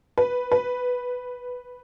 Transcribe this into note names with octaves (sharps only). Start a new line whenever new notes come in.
B4
B4